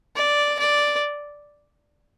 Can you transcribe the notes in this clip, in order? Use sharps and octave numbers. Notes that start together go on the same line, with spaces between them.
D5
D5